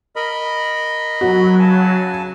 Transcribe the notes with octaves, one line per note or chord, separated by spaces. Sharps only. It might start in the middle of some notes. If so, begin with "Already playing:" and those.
A#4 D#5 B5
F#3 F#4
C#3 G#5 A5